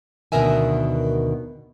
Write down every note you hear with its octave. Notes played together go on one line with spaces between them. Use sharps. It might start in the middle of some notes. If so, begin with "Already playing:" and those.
D2 B2 D#3 A#4 E5 G#5